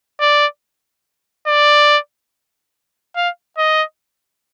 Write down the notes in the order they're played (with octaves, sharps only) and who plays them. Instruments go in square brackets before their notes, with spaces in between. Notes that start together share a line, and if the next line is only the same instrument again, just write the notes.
[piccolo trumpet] D5
D5
F5
D#5